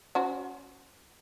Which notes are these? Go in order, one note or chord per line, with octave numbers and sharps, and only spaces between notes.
C#4 F#4 C5